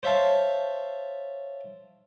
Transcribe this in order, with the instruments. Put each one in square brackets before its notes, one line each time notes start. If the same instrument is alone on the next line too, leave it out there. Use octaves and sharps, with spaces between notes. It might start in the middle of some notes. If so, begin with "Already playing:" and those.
[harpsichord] C5 C#5 E5 F5 A5 C6